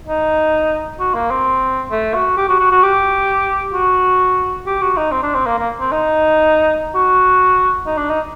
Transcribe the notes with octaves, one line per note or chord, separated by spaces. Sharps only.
D#4
F#4
A#3
C4
A3
F#4
G4
F#4
F#4
F#4
G4
F#4
G4
F#4
D#4
C4
D4
C4
A#3
A#3
C4
D#4
F#4
D#4
D4
D#4